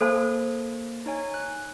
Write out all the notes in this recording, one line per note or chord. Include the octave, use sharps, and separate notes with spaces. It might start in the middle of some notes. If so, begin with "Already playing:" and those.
A#3 A4 C5 A5
D#4 C#5 G#5
F#6